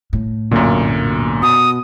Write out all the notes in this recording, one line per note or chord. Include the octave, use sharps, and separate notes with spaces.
A2
B1 F#2 A#2 D3 A#3
B2 D#6